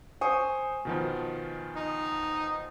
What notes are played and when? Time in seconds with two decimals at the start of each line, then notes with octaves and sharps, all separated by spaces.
0.21 C5 G#5 C#6 D#6
0.85 B2 D#3 F3
1.76 D#4